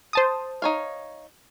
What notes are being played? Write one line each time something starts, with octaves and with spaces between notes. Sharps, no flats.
C5 A5 D#6
D#4 C#5 F5